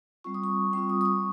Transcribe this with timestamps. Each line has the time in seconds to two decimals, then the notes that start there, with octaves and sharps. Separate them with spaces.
0.24 G3 C4 F4 C#6
0.34 D#6
0.44 C#6
0.73 G3 C4 F4 C#6
0.89 D#6
1.01 D#6
1.05 C#6